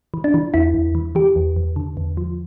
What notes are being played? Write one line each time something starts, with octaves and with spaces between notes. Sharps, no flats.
E3
D4
E3
E2 E4
E2
E3
E3 G4
E2
E2
D3
E2
F3